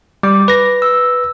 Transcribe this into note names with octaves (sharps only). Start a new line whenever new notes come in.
G3 D6
B4 A#6
E6